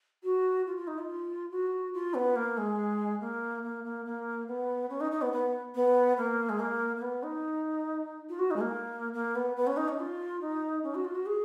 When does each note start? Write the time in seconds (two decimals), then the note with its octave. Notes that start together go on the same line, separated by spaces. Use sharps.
0.24 F#4
0.67 F4
0.77 F4
0.87 D#4
0.98 F4
1.51 F#4
1.94 F4
2.14 B3
2.36 A#3
2.58 G#3
3.21 A#3
3.63 A#3
3.84 A#3
4.06 A#3
4.48 B3
4.90 C#4
5.01 D#4
5.12 D#4
5.22 B3
5.32 B3
5.75 B3
6.17 A#3
6.49 G#3
6.60 A#3
6.97 A#3
7.02 B3
7.23 D#4
8.29 F4
8.39 F#4
8.51 D#4
8.56 G#3
8.61 A#3
9.14 A#3
9.35 B3
9.56 B3
9.67 C#4
9.77 D#4
9.88 C#4
9.99 F4
10.41 D#4
10.83 C#4
10.95 F#4
11.05 F4
11.15 F#4
11.26 G#4